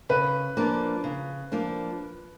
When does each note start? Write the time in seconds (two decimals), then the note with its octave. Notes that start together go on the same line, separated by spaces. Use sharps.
0.09 C#3 B4
0.57 F3 A#3 D4
1.04 C#3
1.52 F3 A#3 D4